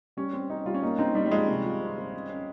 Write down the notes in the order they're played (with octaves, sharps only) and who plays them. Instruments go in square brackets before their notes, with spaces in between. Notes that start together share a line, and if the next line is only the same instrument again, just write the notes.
[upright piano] G3 [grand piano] C#4
[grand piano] C4 [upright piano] C#4
[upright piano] C#4 [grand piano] D#4
[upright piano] G3 [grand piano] F4
[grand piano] C#4
[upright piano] A#3 [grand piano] D#4
[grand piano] C4 [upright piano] D#4
[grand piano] G3 [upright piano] D#4
[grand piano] G3
[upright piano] F3 [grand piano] G#3
[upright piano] C3
F4
C4
C4
C#4
C#4